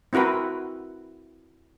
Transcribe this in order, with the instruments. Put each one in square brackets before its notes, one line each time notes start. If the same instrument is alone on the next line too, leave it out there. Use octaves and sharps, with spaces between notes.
[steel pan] C4 E4 F#4 A#4 B4